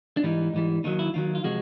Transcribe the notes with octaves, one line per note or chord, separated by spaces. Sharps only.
D4
G#2 E3 G3 D#4
G#2 E3 G3
D#2 D#3 F#3 D#4
E4
D#2 D#3 F#3 F4
F4
C3 F3 G#3 F#4